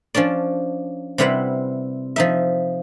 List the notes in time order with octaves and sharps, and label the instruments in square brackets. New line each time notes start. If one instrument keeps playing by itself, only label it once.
[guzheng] F3 C#4 D4 D5
C3 G3 E4 B4 C5 F#5
F3 D#4 E5